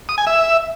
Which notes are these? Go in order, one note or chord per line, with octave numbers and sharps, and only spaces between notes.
D#6
G#5
E5